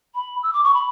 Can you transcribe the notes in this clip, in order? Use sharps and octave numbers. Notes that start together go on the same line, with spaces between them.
B5
E6
D6
C#6
B5